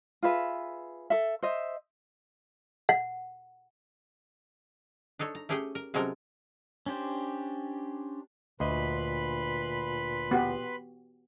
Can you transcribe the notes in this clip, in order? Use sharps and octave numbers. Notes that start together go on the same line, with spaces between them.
F4 G#4 B4 E5
A4 E5
C5 D#5 E5
F#5
D4 D#4 A4 C#5
A#5
A3 C#4 G4 G#4 C#5 G5
A#4
C3 F#3 G#3 C#4 A4 A#4
C#4 D4 G4 C5
D2 A#2 B4 D#5 B5 C6
B3 F#4 G4